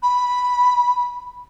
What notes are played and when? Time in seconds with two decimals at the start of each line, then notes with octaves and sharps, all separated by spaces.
0.02 B5